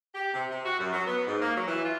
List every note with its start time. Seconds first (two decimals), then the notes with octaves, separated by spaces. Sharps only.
0.14 G4
0.34 C3
0.50 C3
0.65 F#4
0.79 F#2
0.93 F#3
1.06 B3
1.26 G#2
1.41 A#3
1.56 F#3
1.68 E3
1.85 F4